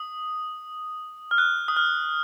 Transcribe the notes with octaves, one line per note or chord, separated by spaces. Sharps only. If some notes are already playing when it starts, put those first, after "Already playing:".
Already playing: D#6
F6
F#6
D#6
F6